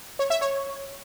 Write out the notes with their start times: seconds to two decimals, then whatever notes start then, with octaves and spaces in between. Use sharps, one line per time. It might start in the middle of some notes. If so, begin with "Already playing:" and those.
0.19 C#5
0.30 E5
0.41 C#5